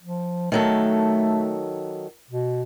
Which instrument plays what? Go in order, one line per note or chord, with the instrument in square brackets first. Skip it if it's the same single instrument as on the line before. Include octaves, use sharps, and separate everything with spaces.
[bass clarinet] F3
[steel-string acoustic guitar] D#3 F#3 A4 [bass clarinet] A3
[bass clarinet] B2